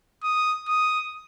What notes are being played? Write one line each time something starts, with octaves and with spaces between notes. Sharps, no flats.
D#6
D#6